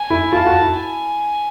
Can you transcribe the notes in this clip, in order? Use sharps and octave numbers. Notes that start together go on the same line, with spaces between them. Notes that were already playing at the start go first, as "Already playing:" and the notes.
Already playing: G#5
E4
F4 A5
F#4
E4
G#5